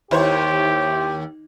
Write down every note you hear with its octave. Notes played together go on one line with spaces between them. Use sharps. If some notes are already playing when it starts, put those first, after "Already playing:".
D#2 E4 G4 C5 C#5